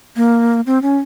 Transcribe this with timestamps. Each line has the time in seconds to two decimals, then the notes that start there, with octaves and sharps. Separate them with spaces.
0.16 A#3
0.66 C4
0.82 C#4